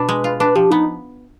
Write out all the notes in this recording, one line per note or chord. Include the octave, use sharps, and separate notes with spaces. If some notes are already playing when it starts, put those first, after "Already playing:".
Already playing: B2 D4 B4
G#3
F4
D4 B4
F3 G4
B3 D#4